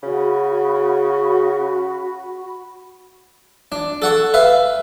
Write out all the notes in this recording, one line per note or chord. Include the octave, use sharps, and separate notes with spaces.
C#3 F#4 B5
D4
A4 F#5 C#6
B4 E5 F5